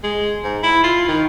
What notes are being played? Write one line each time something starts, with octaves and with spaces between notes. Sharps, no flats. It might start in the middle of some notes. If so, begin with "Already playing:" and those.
G#3
G#2
E4
F4
D#3